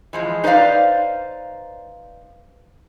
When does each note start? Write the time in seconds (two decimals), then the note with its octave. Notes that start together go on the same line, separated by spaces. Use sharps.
0.13 E3 F3 G#3
0.44 D#4 B4 C5 D5 F5